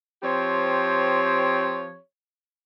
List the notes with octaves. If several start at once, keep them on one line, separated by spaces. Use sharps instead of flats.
F3 C4 G4 C#5